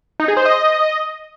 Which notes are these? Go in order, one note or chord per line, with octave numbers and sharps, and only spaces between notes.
D#4
G#4
C5
D#5